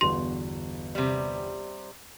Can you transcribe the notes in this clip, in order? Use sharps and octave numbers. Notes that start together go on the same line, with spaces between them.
G1 E2 F#4 C6
C3 G3